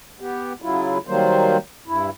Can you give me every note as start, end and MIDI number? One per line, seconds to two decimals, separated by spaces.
0.20 0.53 59
0.20 0.53 67
0.62 0.98 49
0.62 0.98 54
0.62 0.98 64
0.62 0.98 65
1.07 1.57 51
1.07 1.57 54
1.07 1.57 55
1.07 1.57 58
1.07 1.57 72
1.87 2.10 43
1.87 2.10 64